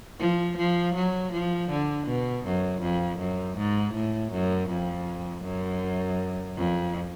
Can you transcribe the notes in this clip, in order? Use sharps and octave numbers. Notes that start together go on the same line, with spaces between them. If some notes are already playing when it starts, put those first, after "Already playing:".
F3
F3
F#3
F3
D3
B2
F#2
F2
F#2
G#2
A2
F#2
F2
F#2
F2